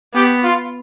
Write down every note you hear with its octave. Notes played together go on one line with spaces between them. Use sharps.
B3 G4
F4